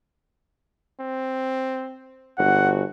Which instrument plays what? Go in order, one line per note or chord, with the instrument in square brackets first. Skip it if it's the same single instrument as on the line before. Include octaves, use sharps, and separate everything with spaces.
[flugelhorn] C4
[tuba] G1 [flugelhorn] F#4 [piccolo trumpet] F#5